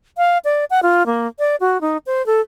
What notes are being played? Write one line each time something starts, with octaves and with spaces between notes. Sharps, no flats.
F5
D5
F#5
F4
A#3
D5
F#4
D#4
C5
A4